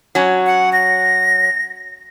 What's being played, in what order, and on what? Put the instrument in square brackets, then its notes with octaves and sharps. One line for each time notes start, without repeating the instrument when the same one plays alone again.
[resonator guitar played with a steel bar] F#3 C#4
[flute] F#5
A#6